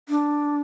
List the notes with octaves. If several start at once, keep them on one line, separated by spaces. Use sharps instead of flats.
D4